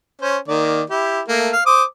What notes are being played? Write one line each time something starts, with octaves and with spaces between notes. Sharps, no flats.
C#4 C5
D#3 A#3 D5
E4 G4
A3 A#3
F5
C5 D6 D#6